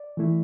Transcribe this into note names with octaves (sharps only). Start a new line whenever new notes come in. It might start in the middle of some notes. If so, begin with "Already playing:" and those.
Already playing: D5
E3 A3 E4